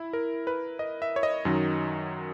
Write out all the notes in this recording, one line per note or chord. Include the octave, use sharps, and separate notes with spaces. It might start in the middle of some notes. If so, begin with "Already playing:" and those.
Already playing: E4
A#4
B4
D#5
E5
C#5
D#5
F#2 D#3 F#3